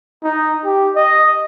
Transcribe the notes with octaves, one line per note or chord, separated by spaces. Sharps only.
D#4
G4
D#5